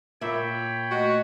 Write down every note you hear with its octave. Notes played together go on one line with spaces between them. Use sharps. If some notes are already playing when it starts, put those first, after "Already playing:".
A#2 C#5 E5 G5 B5
A3 F#4 D#5